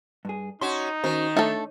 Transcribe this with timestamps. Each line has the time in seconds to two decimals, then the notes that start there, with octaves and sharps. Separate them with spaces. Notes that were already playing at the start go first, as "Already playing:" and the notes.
0.25 G2 G#4
0.61 C#4 D#4 F#4 C6
1.04 D#3 C#4 F#4 C5
1.37 A3 D4 A4 C#5